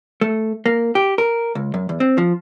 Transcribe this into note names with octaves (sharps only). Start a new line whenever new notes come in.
A3
A#3
G4
A#4
C#2
F#2
E2
C4
F3